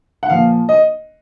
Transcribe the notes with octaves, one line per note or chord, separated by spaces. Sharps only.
F#5
A#2 F3 F5
D#5